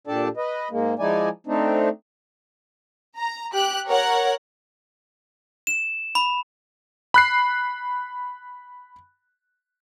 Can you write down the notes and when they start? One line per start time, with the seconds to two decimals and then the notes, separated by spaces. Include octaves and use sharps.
0.07 A#2 D4 G4 A4 D5 A5
0.37 B4 D#5
0.71 G#2 G#3 A#3
0.99 F3 G#3 D#4 E4 D5 G#5
1.47 A3 C4 D4 D#4
3.17 A#5
3.53 G4 F#6
3.88 A#4 C#5 F#5
5.67 E7
6.15 B5
7.14 B5 F#6 C7